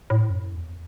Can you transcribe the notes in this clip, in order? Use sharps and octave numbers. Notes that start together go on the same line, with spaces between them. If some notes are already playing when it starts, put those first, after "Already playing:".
A2
F#2
E2